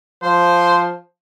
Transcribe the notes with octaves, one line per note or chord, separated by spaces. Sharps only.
F3 C5